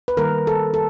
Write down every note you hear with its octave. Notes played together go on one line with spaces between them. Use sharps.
B4
D#3 G3 A#3 A#4
A4
A4